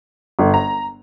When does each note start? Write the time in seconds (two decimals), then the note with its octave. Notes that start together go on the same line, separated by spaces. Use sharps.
0.39 G1
0.54 A#5